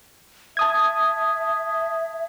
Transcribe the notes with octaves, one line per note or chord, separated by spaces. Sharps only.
E5 A5 D#6 G#6